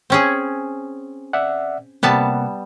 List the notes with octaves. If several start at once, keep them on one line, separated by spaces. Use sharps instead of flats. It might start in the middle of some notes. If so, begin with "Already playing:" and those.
C4 C#4 G#4
D5 E5 F#5
C3 G3 A#3 B3 F#5 A5